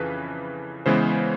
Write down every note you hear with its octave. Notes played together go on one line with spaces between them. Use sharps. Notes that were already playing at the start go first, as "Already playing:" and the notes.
Already playing: F2 C#3 E3 B4
C#3 E3 G#3 B3 C5